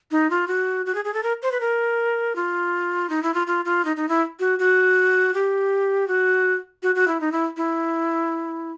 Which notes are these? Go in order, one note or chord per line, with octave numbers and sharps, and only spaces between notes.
D#4
F4
F#4
F#4
G#4
G#4
A4
A#4
C5
B4
A#4
F4
D#4
E4
F4
F4
F4
D#4
D#4
E4
F#4
F#4
G4
F#4
F#4
F#4
E4
D#4
E4
E4